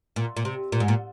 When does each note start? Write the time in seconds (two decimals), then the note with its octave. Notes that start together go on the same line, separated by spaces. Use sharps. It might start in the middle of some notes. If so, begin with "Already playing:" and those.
0.16 A#2
0.37 A#2
0.45 C3
0.72 A#2
0.80 G#2
0.88 A#2